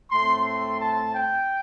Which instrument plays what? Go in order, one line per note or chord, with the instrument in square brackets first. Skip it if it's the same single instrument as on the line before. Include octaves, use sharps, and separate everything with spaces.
[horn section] A2 A3 C4 C6
C6
A5
G5